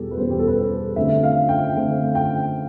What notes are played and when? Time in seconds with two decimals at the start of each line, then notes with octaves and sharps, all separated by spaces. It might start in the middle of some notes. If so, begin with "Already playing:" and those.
Already playing: E2 B2 G3 G4 A4
0.11 B4
0.17 E2 B2 G3 C5
0.30 G4
0.39 A4
0.48 B4
0.56 C5
0.96 D3 A3 C4 E5
1.23 F5
1.49 G5
1.75 D3 A3 C4
2.15 G5